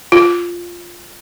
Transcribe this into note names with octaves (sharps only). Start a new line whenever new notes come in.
F4